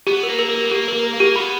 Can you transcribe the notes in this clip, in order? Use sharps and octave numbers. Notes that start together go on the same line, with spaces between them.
B3 G4
A#4
A#3
A#4
A#3
G4
B3
A#3 G4
A#4
A#3
A#4
A#3
G4
B3 B5